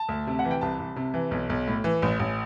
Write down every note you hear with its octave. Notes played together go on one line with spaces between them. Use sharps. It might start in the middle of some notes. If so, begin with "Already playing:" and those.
Already playing: A5
D2
C3
F#5
E3
G5
C2 A5
C2
C3
E3
B1
B1
A2
E3
A1
A1